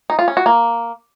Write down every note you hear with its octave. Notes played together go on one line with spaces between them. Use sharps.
D#4
F4
C#4
F#4
A#3